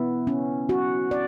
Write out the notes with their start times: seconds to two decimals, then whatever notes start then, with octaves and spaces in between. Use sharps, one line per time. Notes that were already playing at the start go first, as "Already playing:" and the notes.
Already playing: B3 E4
0.27 C#4
0.69 F#4
1.11 D5